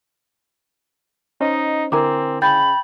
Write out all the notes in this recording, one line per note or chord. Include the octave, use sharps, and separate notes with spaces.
C#4 D#4 C5 D#5
D3 C4 E4 A#4 G#5 A#5 D6
C#3 G5 B5 G6 A6